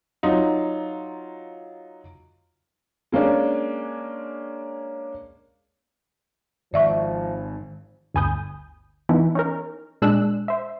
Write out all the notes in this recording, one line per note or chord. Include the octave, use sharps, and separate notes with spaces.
F#3 D#4 F4
G#3 A#3 C#4 D4
G#2 D#3 F3 D5 E5 C#6
G1 D2 G#5 B5 D#6 G6
E3 F3 B3 D#4 E4
C#4 D#4 A#4
A#2 G#3 D4 E6 F#6
C5 E5